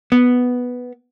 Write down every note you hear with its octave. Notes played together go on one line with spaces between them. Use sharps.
B3